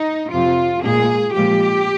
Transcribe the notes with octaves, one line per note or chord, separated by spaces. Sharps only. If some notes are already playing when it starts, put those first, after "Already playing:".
Already playing: D#4
F2 C3 F3 F4
A#2 G#3 G#4
A#2 F3 G#3 G4